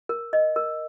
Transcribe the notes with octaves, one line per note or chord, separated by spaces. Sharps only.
A#4
D#5
A#4